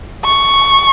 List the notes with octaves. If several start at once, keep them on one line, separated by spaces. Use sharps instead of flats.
C#6